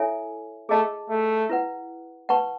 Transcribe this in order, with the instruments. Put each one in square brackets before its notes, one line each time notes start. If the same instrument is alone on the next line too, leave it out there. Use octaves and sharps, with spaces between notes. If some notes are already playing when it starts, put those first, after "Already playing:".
Already playing: [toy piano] E4 A4 C#5 E5 G#5
[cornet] A3 [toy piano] G#4 D#5 A5
[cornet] A3
[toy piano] E4 B4 F#5
B4 F#5 A5 C#6